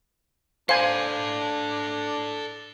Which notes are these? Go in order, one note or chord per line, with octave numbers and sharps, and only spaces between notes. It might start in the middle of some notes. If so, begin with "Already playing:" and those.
D4 A4 C5 F5 G#5 B5